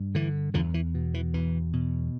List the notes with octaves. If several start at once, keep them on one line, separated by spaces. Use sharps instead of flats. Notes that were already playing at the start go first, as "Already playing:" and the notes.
Already playing: G2
D3 E3
E2 D3 F3
E3
B2
E3
E2 E3
B2